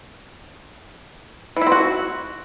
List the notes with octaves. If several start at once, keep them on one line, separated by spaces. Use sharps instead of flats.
E3
E4
C4
F#4